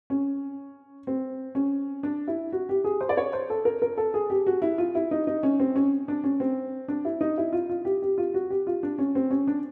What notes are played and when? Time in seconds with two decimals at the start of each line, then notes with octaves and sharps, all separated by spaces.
0.10 C#4
1.07 C4
1.55 C#4
2.03 D4
2.28 E4
2.52 F#4
2.69 G4
2.84 G#4
3.01 C5
3.09 D5
3.17 C#5
3.33 C5
3.50 A4
3.65 A#4
3.82 A#4
3.97 A4
4.14 G#4
4.30 G4
4.47 F#4
4.62 E4
4.78 F4
4.95 E4
5.11 D#4
5.27 D#4
5.43 C#4
5.60 C4
5.76 C#4
6.08 D4
6.24 C#4
6.40 C4
6.88 D4
7.05 E4
7.21 D#4
7.38 E4
7.53 F4
7.69 F4
7.85 G4
8.02 G4
8.18 F4
8.34 F#4
8.50 G4
8.67 F4
8.83 D4
8.98 C#4
9.15 C4
9.31 C#4
9.47 D4